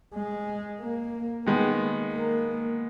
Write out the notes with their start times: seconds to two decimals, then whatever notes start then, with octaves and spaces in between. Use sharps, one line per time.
0.15 G#3
0.81 A#3
1.46 D#3 G#3 A#3 B3
2.13 A#3